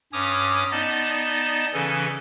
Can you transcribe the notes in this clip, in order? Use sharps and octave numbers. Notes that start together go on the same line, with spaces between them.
G2 C#4 C#5 D6 D#6
B3 D#4 D5 D#5 A5
C#3 E3 C#4 A4